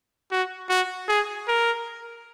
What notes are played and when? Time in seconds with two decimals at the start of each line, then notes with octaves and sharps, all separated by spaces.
0.32 F#4
0.69 F#4
1.08 G#4
1.48 A#4